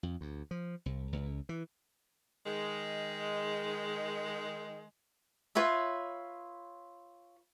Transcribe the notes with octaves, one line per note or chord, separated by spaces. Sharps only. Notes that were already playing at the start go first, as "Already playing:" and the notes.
F2
D2
F3
C2
C#2
E3
D#3 G#3
F4 B4 C#5 E5